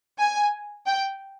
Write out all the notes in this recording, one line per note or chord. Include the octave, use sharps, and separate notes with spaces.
G#5
G5